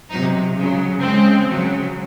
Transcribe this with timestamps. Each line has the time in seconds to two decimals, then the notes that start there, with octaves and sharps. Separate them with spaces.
0.09 C3 F#3 D#4
0.55 C#3 F#3
1.02 C#3 G#3 C4
1.48 C#3 F#3